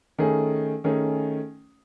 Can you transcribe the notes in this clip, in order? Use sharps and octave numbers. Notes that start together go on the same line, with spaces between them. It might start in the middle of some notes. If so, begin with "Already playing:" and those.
D#3 A3 C#4 G#4
D#3 A3 C#4 G#4